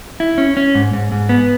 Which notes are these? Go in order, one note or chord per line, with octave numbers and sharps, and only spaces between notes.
E4
C#4
C#4
G#2
G#2
G#2
B3